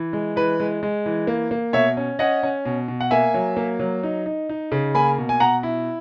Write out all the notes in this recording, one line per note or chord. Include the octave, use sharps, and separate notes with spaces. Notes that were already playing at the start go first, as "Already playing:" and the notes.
Already playing: E3
G#3
E3 B4
G#3
G#3
E3
A#3
A#3
B2 C#5 E5
C#4
C#4 D#5 F#5
C#4
B2
B2
F#5
A#3 E5 G#5
F#3
A#3
F#3
D#4
D#4
D#4
C#3
A#3 G#5 B5
B2
G#5
B2 F#5 A#5
E4